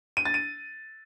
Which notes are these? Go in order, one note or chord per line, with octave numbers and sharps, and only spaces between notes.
D#7
A6
D#7